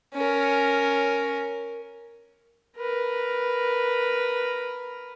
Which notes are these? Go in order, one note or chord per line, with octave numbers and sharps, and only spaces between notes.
C#4 A#4
A#4 B4